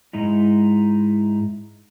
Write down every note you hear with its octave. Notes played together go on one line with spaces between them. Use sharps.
G#2 G#3 D#4 E4